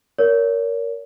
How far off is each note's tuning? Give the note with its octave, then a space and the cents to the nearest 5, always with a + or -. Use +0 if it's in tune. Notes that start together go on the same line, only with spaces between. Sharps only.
A#4 +0 C#5 +35